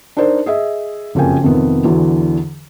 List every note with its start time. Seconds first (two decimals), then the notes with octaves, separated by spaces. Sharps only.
0.17 D4 D#4 A#4 C5 D5
0.46 G#4 D#5 E5
1.15 F#1 F2 C#3 A#3 G5 G#5
1.43 F2 C3 D#3 B3
1.84 E2 D3 E3 F#3